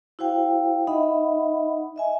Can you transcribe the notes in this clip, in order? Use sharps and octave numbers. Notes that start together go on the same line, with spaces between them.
E4 F#4 C5 F5 G5
D#4 D#5 E5 F#5 B5
D#5 E5 G#5